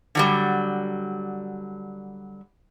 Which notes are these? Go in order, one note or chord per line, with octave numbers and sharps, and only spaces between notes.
D3 F#3 G3